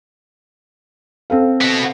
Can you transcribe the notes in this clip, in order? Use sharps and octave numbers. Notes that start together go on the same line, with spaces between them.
C4 A4 F5
B2 B3